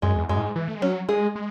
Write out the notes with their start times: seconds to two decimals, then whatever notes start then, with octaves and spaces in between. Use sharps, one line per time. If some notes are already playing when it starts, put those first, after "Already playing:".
0.02 F#2 G#3
0.16 E2
0.29 F#2 G#3
0.37 A2
0.42 G#2
0.56 E3
0.68 A3
0.75 G#3
0.82 F#3 C#4
1.08 G#3 G#4
1.35 G#3